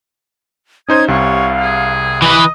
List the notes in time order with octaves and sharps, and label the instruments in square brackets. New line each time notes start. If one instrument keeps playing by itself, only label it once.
[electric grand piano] C#4 D#4 C5 [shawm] D#6 [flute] G#6
[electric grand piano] C2 C3 [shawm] C#5 [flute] F5
[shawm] G#4
[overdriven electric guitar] E3 B4 [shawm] D#5 [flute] D#6